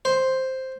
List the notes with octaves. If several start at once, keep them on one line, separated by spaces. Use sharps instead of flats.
C5